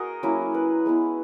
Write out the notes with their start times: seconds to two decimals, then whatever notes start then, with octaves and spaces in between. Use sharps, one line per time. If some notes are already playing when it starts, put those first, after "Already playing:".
Already playing: F#4 G#4 A#4 D#5
0.23 F#3 A#3 C#4 E4
0.54 B4
0.86 G#3 B3 E4